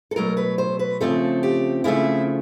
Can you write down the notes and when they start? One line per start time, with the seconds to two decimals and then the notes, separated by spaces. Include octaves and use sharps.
0.11 A4
0.16 B2 F#3 A3 A#4
0.37 B4
0.58 C5
0.79 B4
1.01 C#3 F3 A3 C4 A4
1.43 G4
1.84 C#3 F3 A3 C4 E4